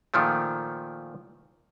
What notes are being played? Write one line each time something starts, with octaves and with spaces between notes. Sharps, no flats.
A#2 D#3 F3 A3